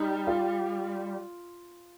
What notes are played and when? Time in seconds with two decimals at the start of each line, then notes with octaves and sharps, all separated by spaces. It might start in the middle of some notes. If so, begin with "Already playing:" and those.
Already playing: G3 D#4
0.27 F4